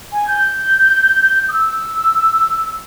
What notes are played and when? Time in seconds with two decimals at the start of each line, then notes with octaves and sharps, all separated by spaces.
0.12 G#5
0.28 G6
1.49 D#6
1.52 E6